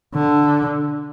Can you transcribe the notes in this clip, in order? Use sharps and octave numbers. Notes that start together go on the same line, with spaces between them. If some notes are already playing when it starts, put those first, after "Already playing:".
D3